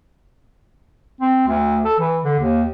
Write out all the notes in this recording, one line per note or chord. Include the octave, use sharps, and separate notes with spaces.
C4
D2
A4
E3
D3
D#2